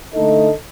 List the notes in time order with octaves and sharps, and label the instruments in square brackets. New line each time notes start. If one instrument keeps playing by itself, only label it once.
[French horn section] D3 A3 D#4 A4 D#5